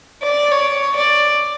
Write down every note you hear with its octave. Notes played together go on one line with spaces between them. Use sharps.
D5
C#5
D5